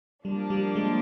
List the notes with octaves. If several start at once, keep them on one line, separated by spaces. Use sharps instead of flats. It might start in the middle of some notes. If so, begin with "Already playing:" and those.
F3 G3 A#3 D4
G3
G#3